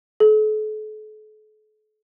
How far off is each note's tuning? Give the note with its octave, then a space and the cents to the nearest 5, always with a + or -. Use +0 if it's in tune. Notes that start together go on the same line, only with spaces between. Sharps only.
A4 -40